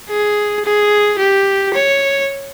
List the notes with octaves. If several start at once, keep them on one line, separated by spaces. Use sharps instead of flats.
G#4
G#4
G4
C#5